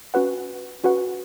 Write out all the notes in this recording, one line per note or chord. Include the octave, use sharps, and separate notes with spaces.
C#4 F#4 B4 F#5
C#4 F#4 B4 F#5